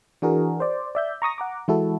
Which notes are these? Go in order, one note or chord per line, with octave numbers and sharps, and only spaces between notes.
E3 D4 F#4 G#4 A#4
C5 D5
D5 E5 G6
A#5 C#6 D#6 A#6
F#5 A#5 D6
E3 G#3 E4 F#4 A4